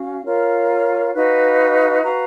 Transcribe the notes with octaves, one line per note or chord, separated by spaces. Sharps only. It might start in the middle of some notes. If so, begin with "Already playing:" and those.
Already playing: C#4 F#4 F5
F4 A#4 C#5
D#4 F#4 B4 F5
F#4 B4 F5 A#5